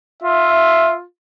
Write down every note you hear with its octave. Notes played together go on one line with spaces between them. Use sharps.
F4 E5